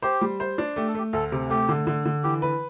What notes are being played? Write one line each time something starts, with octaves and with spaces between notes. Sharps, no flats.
G4 C5
G3
C5
D4
A3 G4
A4
A3 G4
D2 A4
C3
A3 G4
D3
D3
D3
E3 G4
B4